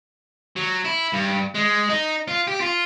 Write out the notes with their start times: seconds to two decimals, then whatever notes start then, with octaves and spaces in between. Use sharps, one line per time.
0.56 F#3
0.85 E4
1.13 G2
1.54 G#3
1.89 D#4
2.28 F4
2.47 G4
2.60 F4